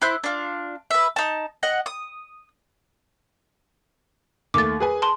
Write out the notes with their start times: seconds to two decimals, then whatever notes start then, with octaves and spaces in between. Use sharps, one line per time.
0.02 E4 C5 F#6
0.24 D4 F4
0.91 B4 E5
1.16 D#4 A5
1.63 D#5 F#5 F#6
1.86 D#6
4.54 D#2 A3 D6 A6
4.80 G#4 B4 G#5
5.02 A5 C6